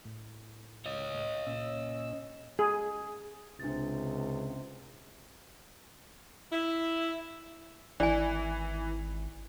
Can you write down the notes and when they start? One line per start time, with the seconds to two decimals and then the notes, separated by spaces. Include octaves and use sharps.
0.05 A2
0.86 C#5 D#5
1.47 A#2 C#4 E6
2.59 G#4
3.60 C#2 C3 D4 A6
6.51 E4
8.00 G#1 E3 D5 G#5